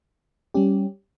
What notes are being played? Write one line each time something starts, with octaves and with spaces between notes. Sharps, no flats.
G3 C#4 G4